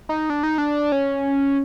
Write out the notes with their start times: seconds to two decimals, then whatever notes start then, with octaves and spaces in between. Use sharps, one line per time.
0.09 D#4
0.30 D4
0.43 D#4
0.58 D4
0.92 C#4